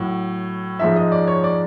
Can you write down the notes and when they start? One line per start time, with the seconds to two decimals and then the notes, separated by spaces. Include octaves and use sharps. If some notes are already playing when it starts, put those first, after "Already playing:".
Already playing: A2 F#3
0.79 G#2 F3 G#3 E5
0.96 D#5
1.12 D5
1.27 C#5
1.44 D5